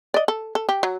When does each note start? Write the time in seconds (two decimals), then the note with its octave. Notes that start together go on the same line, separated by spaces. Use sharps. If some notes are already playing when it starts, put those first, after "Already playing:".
0.14 D5 D#5
0.28 A4
0.55 A4
0.69 G4
0.83 F#3